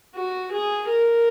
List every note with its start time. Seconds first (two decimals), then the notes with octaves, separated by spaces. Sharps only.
0.15 F#4
0.51 G#4
0.88 A#4